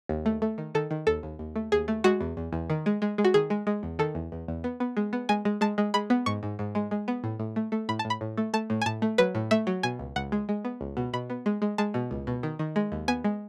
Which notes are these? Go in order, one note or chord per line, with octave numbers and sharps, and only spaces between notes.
D#2
A3
A3
D#3
D#3 A4
D#3
D#2 A4
D#2
D#2
A3
D#2 G#4
A3
G#3 F#4
E2
E2
E2
D#3
G#3
G#3
G#3
F#4
D#3 G#4
G#3
G#3
E2
D#3 A4
E2
E2
E2
B3
B3
G#3
B3
G#3 G#5
G#3
G#3 A5
G#3
G#3 B5
B3
G#2 C#6
G#2
G#2
G#3
G#3
B3
A2
A2
A3
A3
A2 B5
A5
A2
B5
A2
A3
A3 A5
A2
G#5
A2 A5
A3
F#3 B4
A2
A3 E5
F#3
B2 G#5
C#2
C#2 F#5
G#3
G#3
B3
C#2
B2
B2 B5
B3
G#3
G#3
G#3 A5
B2
C#2
B2
D#3
D#3
G#3
D#2
B3 G#5
G#3